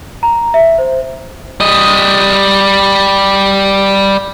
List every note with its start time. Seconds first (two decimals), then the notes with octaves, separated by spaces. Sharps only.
0.23 A#5
0.54 E5
0.78 C5
1.60 G3 D#5